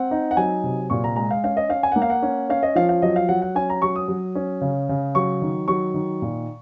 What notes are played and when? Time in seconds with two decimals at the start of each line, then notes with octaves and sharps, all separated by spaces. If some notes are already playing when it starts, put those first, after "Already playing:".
Already playing: C4 F#5
0.11 D#4
0.31 F#5
0.37 F#3 G#5
0.64 C3
0.90 A#2 C#6
1.04 A#5
1.16 G#3 A#5
1.31 F5
1.44 C#4 F5
1.57 D#5
1.69 C#4 F5
1.83 G#5
1.92 F#5
1.96 A#3
2.02 F5
2.10 F#5
2.22 C#4
2.50 C#4 F5
2.63 D#5
2.76 F3 F5
2.89 F5
3.02 F#3 D#5
3.16 F5
3.29 F#3 F#5
3.42 F#5
3.55 C#4 G#5
3.70 A#5
3.82 F#3 C#6
3.96 D#6
4.08 F#3
4.35 C#4
4.61 C#3
4.89 C#3
5.15 F#3 C#6
5.42 D#3
5.68 F#3 C#6
5.94 D#3
6.22 A#2